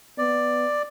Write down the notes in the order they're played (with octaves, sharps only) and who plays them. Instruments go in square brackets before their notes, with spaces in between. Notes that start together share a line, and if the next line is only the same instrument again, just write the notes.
[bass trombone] B3 [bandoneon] D5